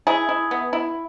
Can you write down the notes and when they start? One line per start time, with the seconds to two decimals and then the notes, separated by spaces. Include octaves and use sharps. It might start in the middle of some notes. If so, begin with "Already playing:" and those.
0.07 E4 G#4
0.29 E4
0.51 B3
0.73 E4